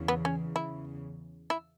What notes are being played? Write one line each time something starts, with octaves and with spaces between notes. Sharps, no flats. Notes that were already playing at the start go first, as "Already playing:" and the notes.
Already playing: E2 C#3 E3
B3
C#4
E4
E4